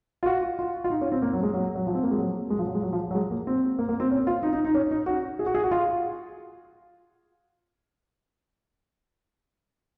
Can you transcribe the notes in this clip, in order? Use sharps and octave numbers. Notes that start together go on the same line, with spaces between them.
F4
F#4
F4
F4
D#4
C#4
C4
A#3
F#3
G#3
F#3
F#3
F3
C4
A#3
G#3
F#3
G#3
F3
F#3
G#3
F#3
F3
F#3
G#3
A#3
C4
A#3
A#3
C4
C#4
F4
D#4
D#4
D#4
C#4
D#4
F#4
G#4
F#4
G#4
F#4
F4